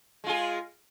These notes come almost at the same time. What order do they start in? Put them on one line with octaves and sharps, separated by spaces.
G#3 F4 G#4